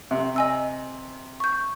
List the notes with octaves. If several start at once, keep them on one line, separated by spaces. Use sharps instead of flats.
C3
D#5 G#5 E6
C#6 G6